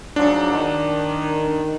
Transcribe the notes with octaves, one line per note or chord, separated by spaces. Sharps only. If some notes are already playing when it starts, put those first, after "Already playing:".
G#2 F3 F#3 D4
D#3